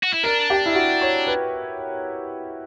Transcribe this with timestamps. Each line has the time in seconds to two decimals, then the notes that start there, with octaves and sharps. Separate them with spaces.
0.04 F#4
0.14 E4
0.24 D4 A#4
0.50 G4
0.66 E4
0.75 F#4
1.01 C#5
1.27 B4